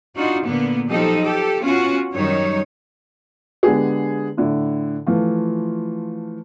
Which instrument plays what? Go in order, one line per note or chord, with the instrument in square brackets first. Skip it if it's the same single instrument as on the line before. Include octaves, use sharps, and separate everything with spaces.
[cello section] D4 D#4 F4 F#4
A#2 D3 A#3 B3
F3 F#3 D#4 G4 A4 D#5
G4 A4
B3 C#4 F4 F#4
F#2 D#3 G3 D#4 C#5
[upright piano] D3 G#3 B3 G4 G#4
A2 D3 E4
E3 F3 A3 F4